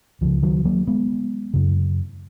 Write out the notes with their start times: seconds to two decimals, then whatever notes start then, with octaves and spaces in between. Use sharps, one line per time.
0.21 C#2 C#3 F3
0.43 D#3 F#3
0.65 F#3 A#3
0.87 G#3 B3
1.54 F#2 C#3